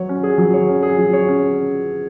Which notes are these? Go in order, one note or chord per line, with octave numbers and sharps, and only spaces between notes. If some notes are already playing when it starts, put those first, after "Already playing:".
Already playing: F#3 C#5
C#4
G#4
F#3
C#5
C#4
G#4
F#3
C#5
C#4